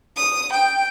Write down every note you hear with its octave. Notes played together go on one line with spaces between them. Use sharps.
D#6
G5